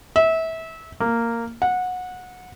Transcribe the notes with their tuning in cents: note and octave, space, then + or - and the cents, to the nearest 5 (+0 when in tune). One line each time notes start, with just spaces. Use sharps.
E5 -25
A#3 -10
F#5 -20